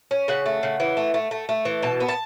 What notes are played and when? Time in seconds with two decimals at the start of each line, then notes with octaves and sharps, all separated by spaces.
0.11 C#4
0.28 C#3 F#5
0.46 A3
0.63 C#3
0.80 E3
0.97 A3
1.14 A3
1.31 A3
1.49 A3
1.65 E3
1.82 B2 A5
2.00 B3
2.08 A5